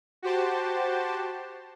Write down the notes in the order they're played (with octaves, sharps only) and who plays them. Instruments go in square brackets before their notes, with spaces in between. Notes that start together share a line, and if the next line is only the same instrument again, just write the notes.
[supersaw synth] F#4 G4 C5 A5